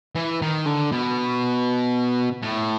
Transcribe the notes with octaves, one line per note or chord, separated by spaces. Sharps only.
E3
D#3
D3
B2
A2